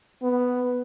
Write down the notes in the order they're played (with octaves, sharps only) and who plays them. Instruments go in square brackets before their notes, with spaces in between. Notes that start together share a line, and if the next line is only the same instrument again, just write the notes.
[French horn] B3